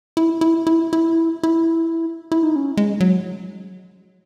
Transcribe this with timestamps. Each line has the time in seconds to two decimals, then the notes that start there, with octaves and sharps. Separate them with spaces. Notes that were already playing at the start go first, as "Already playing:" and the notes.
0.17 E4
0.41 E4
0.67 E4
0.93 E4
1.43 E4
2.32 E4
2.43 D#4
2.56 C#4
2.77 G#3
3.00 F#3